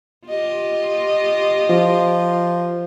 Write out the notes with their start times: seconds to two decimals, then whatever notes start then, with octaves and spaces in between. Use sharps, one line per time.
0.27 F4 G4 D#5
1.69 F3